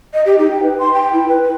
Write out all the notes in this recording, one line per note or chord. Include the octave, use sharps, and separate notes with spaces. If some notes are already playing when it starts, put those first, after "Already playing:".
D#5
G4
D#4
G5
B4
C6
G5
E4
B4
B4